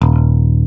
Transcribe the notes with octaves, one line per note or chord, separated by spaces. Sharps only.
D#1